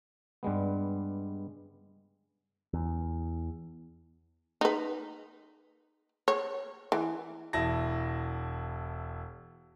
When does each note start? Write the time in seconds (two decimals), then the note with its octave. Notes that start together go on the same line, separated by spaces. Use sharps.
0.43 G2 G3 G#3 B3
2.73 E2
4.61 D#4 B4
6.28 C#5
6.92 E3
7.53 E1 E4 A5 A#6